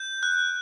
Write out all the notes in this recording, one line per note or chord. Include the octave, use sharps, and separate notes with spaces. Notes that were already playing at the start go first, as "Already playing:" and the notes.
Already playing: G6
F#6